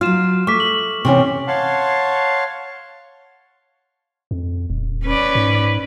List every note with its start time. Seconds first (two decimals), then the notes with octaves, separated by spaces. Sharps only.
0.01 F#3 F4 F6 E7
0.47 A3 C#6 D6 B6
0.60 F#7
1.05 C3 E3 C#4 C#6
1.48 C#5 F5 F#5 A5 C6
4.31 F2
4.70 D#1
5.05 C#4 B4 D5
5.35 G#2